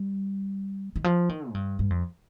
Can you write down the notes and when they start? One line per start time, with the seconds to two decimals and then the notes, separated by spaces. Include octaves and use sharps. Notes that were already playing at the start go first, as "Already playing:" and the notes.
Already playing: G3
0.96 D#3
1.04 F3
1.29 D#3
1.49 G#2
1.54 G2
1.79 G2
1.90 F2